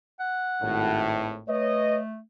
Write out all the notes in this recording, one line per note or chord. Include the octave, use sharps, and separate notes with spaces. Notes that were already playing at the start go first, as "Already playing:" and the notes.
F#5
G#1 A2
A3 B4 C#5 D#5